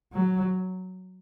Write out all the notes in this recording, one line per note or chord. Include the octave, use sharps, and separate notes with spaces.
F#3